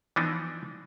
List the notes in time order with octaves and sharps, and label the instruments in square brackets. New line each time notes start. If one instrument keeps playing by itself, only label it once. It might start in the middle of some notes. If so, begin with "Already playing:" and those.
[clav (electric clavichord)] E3 F3 B3 D4 D#4